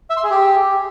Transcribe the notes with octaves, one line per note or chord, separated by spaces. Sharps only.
E5
C6
G#4
G4